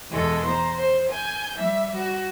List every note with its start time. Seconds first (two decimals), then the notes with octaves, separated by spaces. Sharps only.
0.10 E2 B2 G#3 A4
0.45 C5 A#5
0.78 C5
1.09 G#5 G6
1.56 G3 E5
1.96 F#4